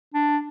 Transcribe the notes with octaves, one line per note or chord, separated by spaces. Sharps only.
D4